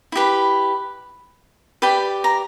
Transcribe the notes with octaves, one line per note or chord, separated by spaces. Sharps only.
E4 G4 B4
G4 B4 D5 G5
A#5